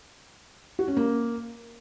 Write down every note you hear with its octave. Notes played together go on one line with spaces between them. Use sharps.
F#4
C#4
A#3